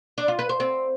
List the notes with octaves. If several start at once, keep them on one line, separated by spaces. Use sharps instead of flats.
D4
F4
B4
C5
C4